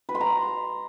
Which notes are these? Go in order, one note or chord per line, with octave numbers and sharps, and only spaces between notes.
B4
C6
A#5